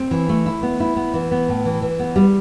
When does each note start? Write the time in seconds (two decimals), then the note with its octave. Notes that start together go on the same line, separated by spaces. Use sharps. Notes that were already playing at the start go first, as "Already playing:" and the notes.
Already playing: C4
0.11 E3
0.29 A3
0.46 E4
0.63 B3
0.80 E4
0.96 B3
1.14 E3
1.31 B3
1.48 A2
1.65 E3
1.82 E3
1.99 B3
2.16 G3